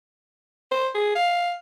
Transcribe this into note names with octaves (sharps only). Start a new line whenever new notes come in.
C5
G#4
F5